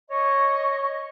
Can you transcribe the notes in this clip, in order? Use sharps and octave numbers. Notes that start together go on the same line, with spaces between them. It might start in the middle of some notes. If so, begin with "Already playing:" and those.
C#5 D#5 C#6